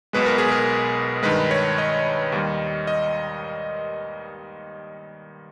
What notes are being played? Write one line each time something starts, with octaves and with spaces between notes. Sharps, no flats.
B1 B2 G#3 B4
A#4
G#4
A#4
G2 D#3 G#3 B4
C#5
D#5
D#2 D#3 G3
D#5